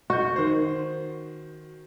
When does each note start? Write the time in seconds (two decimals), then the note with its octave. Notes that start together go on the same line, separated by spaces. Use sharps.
0.10 F#4 C#6 G6
0.36 D#3 C5